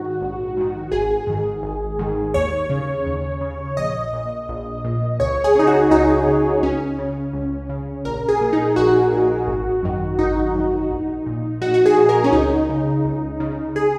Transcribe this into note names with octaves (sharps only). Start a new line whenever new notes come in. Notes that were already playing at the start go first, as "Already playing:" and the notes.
Already playing: G#2 D#3 F#4
A#1
G#2 D#3
G#1 G#4
G#2 D#3
G#1
G#2 D#3
D#2 C#5
C#3
D#2
C#3
A#1 D#5
A#2
A#1
A#2
C#2 C#5
G#4
C#3 D#4
F#4
C#2 D#4
C#3
C#2 C#4
C#3
C#2
C#3
A#1 A#4
G#4
A#2
D#4
A#1 F#4
A#2
G#1
F#2 D#3
G#1 D#4
F#2 D#3
A#1
A#2
A#1 F#4
F#4
G#4
A#2
A#4
C#4
C#2 D#4
C#3
C#2
C#3
G#4